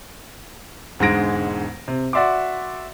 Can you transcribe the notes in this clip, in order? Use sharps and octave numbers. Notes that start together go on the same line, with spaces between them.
E1 G#2 D3 G#3 A#6 D7
C3
F#4 D5 E5 C6 D6